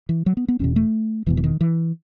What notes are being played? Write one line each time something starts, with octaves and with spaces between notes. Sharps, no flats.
E3
F#3
B3
B3
E1 E2 B2 C#4
A3
E1 E2 B2 E3
E3
D#3
E3